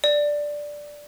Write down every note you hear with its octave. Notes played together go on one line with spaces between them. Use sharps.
D5